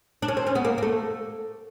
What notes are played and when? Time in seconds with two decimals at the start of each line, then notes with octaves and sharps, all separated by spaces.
0.22 D4
0.28 C#4
0.37 C4
0.47 C#4
0.55 B3
0.65 A#3
0.78 A#3
0.83 A3